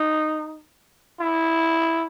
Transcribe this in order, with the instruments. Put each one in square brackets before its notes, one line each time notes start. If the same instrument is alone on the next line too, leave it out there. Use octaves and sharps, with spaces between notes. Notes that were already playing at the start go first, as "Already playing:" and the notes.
Already playing: [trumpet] D#4
E4